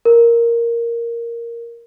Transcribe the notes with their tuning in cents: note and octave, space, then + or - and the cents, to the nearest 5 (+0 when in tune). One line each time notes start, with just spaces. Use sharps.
A#4 +0